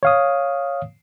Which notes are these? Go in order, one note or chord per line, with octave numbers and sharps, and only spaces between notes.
C#5 F5 D#6